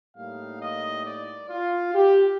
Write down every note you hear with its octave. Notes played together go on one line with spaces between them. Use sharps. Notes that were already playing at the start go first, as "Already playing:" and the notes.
A2 G3 A#3 D#4 F5
D#5
D5
F4
G4